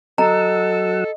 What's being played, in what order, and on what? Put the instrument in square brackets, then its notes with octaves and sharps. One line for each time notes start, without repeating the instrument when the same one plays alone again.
[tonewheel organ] F#3 F#5 E6 [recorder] A4 [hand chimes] D#5 [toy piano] A#5